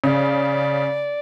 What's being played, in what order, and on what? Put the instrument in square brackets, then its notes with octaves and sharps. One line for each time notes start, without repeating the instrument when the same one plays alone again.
[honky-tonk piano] C#3 [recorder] D5